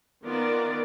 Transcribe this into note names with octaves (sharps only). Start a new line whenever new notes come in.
D#3 B3 F4 A#4 D5